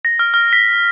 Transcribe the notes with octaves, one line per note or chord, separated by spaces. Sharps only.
A#6
F6
F6
B6